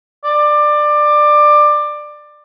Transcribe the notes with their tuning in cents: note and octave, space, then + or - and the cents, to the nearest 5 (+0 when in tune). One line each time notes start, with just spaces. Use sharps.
D5 +20